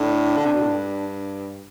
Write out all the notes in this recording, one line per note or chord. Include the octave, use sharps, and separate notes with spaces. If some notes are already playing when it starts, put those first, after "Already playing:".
Already playing: A2 D4
D3
C3
B2
A2
G2